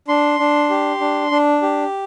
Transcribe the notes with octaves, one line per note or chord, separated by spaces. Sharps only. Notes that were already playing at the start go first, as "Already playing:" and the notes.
D4 C6
D4
G4
D4
D4
G4